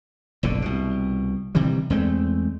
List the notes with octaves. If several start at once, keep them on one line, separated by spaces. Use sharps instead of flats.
F#1 B1 A2 D3
C2 B2
C3 D#3 E3 G3
E2 G#3 A3 C4